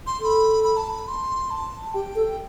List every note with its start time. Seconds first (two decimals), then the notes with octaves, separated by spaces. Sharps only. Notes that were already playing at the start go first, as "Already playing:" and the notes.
0.06 C6
0.20 A4 C6
0.25 B5
0.64 B5
0.77 A5
0.89 B5
1.08 C6
1.51 A5
1.94 G4 G5
2.16 A4